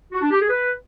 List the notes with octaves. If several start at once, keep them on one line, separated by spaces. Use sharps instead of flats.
F#4
D4
G4
G#4
B4